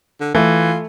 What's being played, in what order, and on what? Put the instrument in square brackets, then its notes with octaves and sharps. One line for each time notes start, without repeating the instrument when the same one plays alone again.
[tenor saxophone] D3
[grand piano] E3 [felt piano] A3 [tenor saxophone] F4